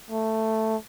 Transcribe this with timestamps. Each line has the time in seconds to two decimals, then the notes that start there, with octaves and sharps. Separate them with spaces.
0.11 A3